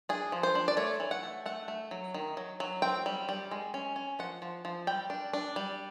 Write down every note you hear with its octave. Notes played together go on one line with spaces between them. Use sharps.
D4 G#4
F3
C5
D4
D5
A3 C#5
E3
F#5
A3
A3 F#5
A3
F#3
D#3
F#3
F#3
C4 G5
G3
G3
G#3
C#4
C#4
F3 F#5
F3
F3
G3 G5
D4
D4
G3